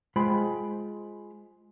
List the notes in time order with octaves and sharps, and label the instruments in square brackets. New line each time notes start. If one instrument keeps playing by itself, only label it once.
[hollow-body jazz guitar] G#3 F4 C5 G5 B5